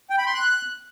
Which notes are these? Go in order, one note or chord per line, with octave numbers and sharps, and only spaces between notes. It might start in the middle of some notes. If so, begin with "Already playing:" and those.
G5
B5
C6
F#6